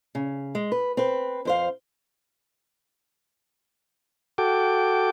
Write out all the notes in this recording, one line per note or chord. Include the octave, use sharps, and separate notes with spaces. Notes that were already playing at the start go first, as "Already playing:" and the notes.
C#3
G#3
B4
C4 B4
F2 C5 F5
F#4 A4 G5 D6